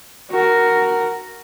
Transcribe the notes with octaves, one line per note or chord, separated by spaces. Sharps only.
F#4 A#4